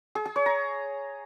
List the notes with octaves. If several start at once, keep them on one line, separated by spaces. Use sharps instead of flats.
G#4
G#4
C#5
A#5